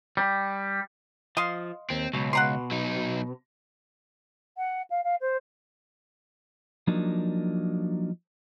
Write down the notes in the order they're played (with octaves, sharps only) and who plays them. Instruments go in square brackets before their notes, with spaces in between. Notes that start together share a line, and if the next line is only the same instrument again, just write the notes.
[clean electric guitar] G3
[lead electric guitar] F3 [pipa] D#5 F5 C6
[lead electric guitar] D#2 [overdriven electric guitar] C4
[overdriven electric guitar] C#2 [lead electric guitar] B2 F#3
[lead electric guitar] B2 [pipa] F#5 A#5 C6
[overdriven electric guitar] F#3 D#4
[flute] F#5
F5
F5
C5
[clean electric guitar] F3 F#3 A#3 D4 D#4